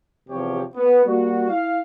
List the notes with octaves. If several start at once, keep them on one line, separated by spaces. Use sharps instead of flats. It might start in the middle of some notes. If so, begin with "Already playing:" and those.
E2 C3 F3 G4 C#5
B3
G3 A#3 F#4
E4 F5